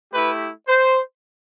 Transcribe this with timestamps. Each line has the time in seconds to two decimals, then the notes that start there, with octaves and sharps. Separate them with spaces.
0.12 A3 E4 G4 B4
0.67 C5